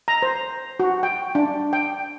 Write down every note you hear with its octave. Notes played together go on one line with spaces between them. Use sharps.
A#5
C5
F#4
G5
D4
G5